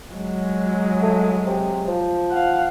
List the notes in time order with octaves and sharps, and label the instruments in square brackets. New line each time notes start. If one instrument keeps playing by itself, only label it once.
[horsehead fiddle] F#3 G#3
[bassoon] A3
C3
F3
[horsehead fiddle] F5 F#5